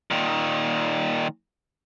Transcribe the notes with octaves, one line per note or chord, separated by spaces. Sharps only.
A#2 D#3